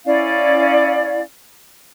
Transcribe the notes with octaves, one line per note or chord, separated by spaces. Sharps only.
C#4 E4 D5 F5